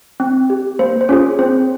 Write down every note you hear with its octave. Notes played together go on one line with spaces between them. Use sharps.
C4
G4
A#3 C5
C5
C#4 F4 G#4 C#5
C4 C5